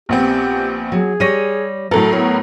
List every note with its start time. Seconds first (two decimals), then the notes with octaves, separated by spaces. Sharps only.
0.09 A#1 B3 C4 G4
0.92 F#3 G#4
1.20 G3 C#5 A#6 D#7
1.91 A2 F#3 A4 A#4
2.13 B3 C#5